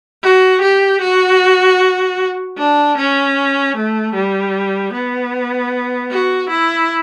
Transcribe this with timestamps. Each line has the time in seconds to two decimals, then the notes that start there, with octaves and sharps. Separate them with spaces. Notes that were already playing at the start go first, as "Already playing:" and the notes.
0.23 F#4
0.62 G4
1.01 F#4
2.58 D4
2.98 C#4
3.76 A3
4.14 G3
4.93 B3
6.11 F#4
6.50 E4